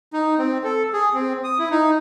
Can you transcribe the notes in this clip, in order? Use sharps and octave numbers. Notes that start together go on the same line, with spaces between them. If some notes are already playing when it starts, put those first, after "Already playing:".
D#4
C4
A4
G#4
C4
D#6
E4
D#4